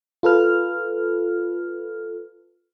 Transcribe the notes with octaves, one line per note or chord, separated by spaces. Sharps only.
F4 A4 B4 F6